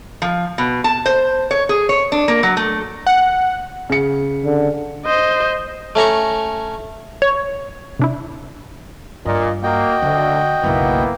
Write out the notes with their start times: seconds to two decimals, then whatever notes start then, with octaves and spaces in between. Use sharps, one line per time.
0.22 F3
0.58 B2
0.84 A5
1.06 C5
1.51 C#5
1.69 G#4
1.89 C#5
2.12 D4
2.28 A#3
2.43 F#3
2.57 A3
3.07 F#5
3.89 C#3 C#7
4.45 D3
5.05 C5 D#5
5.95 A3 C#4 A#5 C#6
7.22 C#5
7.99 C3 D4 E4
9.26 G2 A#2 D#5
9.63 A#3 F#4 D#5 G5
10.02 D2 D3
10.64 F#1 B1 A#3 B3 E4